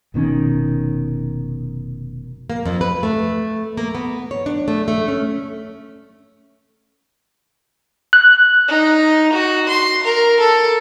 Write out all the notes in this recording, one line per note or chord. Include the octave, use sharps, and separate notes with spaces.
F1 B2 D#3 C#4
A#3
F2
B4
A3
A#3
B3
C#5
D4
A3
A3
C#4
F#6
D#4
F#4
C6
A#4
A4